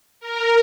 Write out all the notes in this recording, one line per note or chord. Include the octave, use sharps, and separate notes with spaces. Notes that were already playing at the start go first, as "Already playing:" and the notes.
A#4